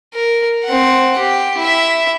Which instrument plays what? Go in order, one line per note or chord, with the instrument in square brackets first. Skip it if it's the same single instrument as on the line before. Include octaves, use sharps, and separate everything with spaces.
[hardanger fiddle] A#4
C4 F#5
G4
E4 E5